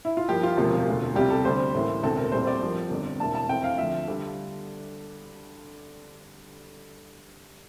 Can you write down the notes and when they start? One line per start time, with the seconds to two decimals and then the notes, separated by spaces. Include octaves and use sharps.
0.05 E4
0.17 F4
0.28 G2 F3 A#3 G4
0.43 F4
0.57 E1 D2 C3 F3 A#3
0.86 E1 D2 D3
1.15 C2 C3 G3 G4
1.30 A4
1.45 D2 D3 G3 C5
1.74 A1 A2 E3 A#3
2.03 E1 D2 D3 A3 C4 A4
2.17 A#4
2.32 A#1 A2 G3 C4 C5
2.47 D5
2.61 G2 F3 A#3
2.90 G1 F2 D3
3.20 E1 E2 E3 A#3 D4 A5
3.35 A5
3.48 F2 E3 A3 C4 G5
3.64 F5
3.78 D2 D3 F3 E5
4.08 D3 G3